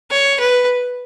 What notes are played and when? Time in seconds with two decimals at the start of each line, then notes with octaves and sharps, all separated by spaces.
0.10 C#5
0.40 B4